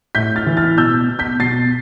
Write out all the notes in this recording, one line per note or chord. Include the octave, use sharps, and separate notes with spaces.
A2 G6 B6
F6 A6
E3
F6 A6
B2 E6 G6
B2
G6 B6
B2 A6 C7